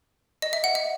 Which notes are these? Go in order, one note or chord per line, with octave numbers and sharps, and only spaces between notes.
D#5
E5
F#5
E5